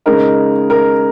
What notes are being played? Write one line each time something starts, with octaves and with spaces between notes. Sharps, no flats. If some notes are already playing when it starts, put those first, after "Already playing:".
C#3 G#3 D#4 A#4
A#4